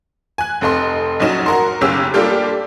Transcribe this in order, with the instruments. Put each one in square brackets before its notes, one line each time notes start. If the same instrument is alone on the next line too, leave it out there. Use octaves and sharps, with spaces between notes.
[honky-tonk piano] G#5 F#6
F1 C4 A4 D#5 C6
A#1 F#3 C#4 D#4 E7
F#4 A#4 C6
F#1 B1 C#4 G4 E6
G3 A#3 D4 F4 G4 A4